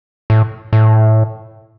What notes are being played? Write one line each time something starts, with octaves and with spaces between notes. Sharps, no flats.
A2
A2